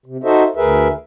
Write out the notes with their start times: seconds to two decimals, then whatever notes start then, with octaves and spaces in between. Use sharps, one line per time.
0.06 C3
0.24 D#4 F#4 A4 C5 D#5 E5
0.56 D2 G#4 A#4 B4 E5